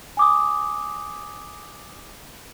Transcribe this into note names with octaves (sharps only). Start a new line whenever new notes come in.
G#5 D6 D#6